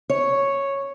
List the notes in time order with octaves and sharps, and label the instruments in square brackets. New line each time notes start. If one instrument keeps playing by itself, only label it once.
[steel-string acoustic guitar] C#5